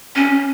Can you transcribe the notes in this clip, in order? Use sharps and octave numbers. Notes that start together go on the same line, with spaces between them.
C#4